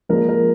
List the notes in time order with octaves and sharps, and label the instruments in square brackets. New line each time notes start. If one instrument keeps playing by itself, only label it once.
[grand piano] A#1 A#2 F3 G#3 A#4
A#4